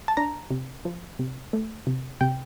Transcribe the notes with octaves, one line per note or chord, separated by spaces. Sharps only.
A5
D4 A#5
C3
F3
C3
A3
C3
C3 G5